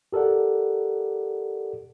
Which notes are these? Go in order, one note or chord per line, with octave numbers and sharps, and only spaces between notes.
G4 A4 A#4 D5 F#5